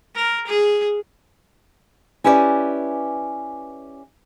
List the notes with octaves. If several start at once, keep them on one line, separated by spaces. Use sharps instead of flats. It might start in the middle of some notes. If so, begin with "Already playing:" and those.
A#4
G#4
C#4 E4 G4 B4 C5 D5